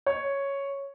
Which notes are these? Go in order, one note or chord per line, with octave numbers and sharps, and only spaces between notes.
C#5